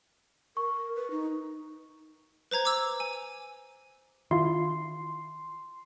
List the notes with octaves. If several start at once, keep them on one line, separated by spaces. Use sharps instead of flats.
A#4 C#6
B4
D#4
B4 C5 A#5 G#6
D6 E6
G#5
D#3 D4 E4 F4 C6